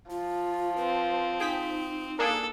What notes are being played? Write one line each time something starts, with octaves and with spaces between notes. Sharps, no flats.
F3 F4
C4 B4
D#4 G#4 G5 B6
A#3 D4 G#4 A4